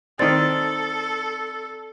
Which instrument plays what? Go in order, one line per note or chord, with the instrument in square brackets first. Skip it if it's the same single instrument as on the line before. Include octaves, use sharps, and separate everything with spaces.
[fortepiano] D#3 C4 [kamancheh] A4 [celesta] D5 A6